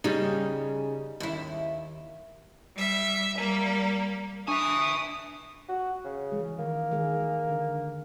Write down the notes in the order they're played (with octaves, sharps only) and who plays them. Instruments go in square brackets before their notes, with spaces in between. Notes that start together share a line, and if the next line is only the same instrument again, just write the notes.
[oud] C#3 G3 [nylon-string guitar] D#4
[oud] D#2 E4
[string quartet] G3 E5
G3 A#3
[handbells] D4 [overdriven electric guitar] E5 G#5 [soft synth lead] C#6 [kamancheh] D#6
[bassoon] F#4
C#3
[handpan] E3 G#3
[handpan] D#3 [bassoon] A#3
[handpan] D#3 G#3 G#4
D3